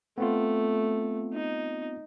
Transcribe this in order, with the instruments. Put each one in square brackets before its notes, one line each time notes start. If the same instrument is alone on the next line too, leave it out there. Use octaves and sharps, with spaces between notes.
[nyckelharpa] A3 [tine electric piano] B3 C4 F4
[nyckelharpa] D#4